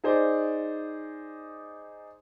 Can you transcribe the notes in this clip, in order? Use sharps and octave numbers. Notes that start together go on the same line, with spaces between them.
D#4 G#4 C5 D5